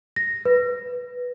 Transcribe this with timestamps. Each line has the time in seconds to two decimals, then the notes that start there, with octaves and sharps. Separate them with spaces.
0.16 A#6
0.45 B4